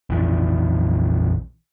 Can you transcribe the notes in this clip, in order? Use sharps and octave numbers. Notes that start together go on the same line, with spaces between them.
A#1 F2 E3 F3